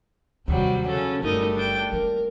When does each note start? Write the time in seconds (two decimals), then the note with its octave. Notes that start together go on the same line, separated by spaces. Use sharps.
0.48 D#2 C3 F#3 G3
0.88 C#3 C#4 A4
1.23 G1 G3 A3 D#4 A#4
1.56 D4 G5
1.91 A#3 C4 A#4